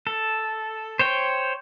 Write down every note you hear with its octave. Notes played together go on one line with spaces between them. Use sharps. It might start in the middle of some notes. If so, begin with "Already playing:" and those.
A4
C5 C#5 G5